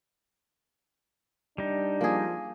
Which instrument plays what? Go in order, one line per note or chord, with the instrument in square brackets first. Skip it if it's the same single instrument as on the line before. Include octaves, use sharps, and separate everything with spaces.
[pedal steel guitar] G3 D#4 [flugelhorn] D4
[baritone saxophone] F3 [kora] A#3 G#4